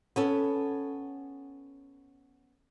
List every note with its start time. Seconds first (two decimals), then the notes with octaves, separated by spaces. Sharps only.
0.16 B3 C#4 A4